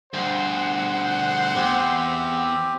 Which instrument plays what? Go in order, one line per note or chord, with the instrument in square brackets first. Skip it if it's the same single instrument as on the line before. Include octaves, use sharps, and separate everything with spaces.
[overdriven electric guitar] D2 G2 [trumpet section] C5 [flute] F#5
[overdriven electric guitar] E2 [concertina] C4 G4